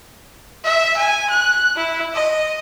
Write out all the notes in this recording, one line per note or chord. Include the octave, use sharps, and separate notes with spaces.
E5
G#5
F#6
E4
D#5